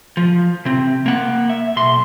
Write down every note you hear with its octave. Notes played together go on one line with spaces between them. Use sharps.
F3
C3 C4
A#3 F#5
E5
B1 C6